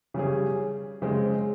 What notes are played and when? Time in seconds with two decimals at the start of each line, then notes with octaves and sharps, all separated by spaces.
0.14 C#3 G3 C#4 G#4
1.02 C#3 G#3 C4